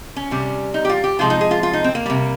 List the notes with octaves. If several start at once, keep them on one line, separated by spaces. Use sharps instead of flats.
C#4
C3 G3
D#4
G4
F4
G4
C3 F3 G#3 F4
D#4
G#4
F4
F4
D#4
C4
A#3
C3 G3